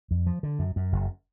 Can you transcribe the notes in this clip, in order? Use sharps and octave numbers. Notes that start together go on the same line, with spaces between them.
F2
F3
D3
F#2
F#2
F#1